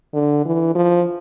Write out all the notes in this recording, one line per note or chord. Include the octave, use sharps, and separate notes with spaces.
D3
E3
F3